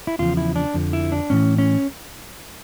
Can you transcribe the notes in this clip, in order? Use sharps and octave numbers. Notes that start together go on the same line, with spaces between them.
E4
E2 C#3 F3 F4
E4
D4
F2 D3 F3
E4
D4
A2 E3 C#4
C#4